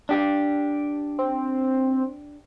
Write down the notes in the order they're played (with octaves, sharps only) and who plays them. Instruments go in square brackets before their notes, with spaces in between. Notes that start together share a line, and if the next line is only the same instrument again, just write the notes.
[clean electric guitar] D4 G4
[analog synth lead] C4